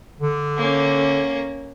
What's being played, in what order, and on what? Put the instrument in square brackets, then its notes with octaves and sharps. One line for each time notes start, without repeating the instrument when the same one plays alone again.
[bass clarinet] D3
[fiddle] A#3 C#4